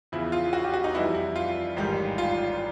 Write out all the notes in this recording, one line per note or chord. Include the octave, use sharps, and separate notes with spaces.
E2 C#3 F3 E4
F4
F#4
G4
F#4
D#4
F2 C3 E3 G3 E4
E4
F4
A1 G#2 D#3 G3
F4